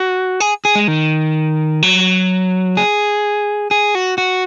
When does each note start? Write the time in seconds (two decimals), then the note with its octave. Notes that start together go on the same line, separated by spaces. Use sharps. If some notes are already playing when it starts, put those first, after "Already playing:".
Already playing: F#4
0.40 G#4
0.65 G#4
0.75 G#3
0.88 D#3
1.83 F#3
2.77 G#4
3.71 G#4
3.95 F#4
4.18 F#4